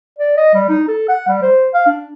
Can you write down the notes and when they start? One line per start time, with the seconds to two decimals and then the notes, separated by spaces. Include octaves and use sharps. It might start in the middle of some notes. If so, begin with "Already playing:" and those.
0.19 D5
0.37 D#5
0.54 G3
0.69 D#4
0.88 A4
1.09 F#5
1.28 G3
1.42 C5
1.74 F5
1.87 D4